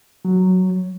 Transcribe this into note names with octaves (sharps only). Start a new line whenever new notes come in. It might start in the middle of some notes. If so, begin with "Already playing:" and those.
F#3